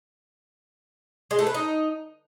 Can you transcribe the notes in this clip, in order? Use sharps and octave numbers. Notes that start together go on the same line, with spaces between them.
G#3
A3
B4
D#4